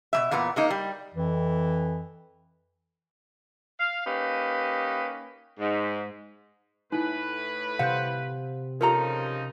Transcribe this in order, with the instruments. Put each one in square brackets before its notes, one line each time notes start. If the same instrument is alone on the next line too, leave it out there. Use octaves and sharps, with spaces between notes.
[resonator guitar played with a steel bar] B2 G3 E5
E2 A#2 B3 A#5
G#3 A#3 D#4
G3
[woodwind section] F2 E3
[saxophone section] F5
A#3 C#4 D#4 G4 B4
G#2
[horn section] A2 B4 [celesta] D#4 E4
[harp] C3 [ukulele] C5 F#5 [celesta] F5 G6
[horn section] C#3 F3 D#4 [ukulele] F4 A4 A#5 [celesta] G4 A#4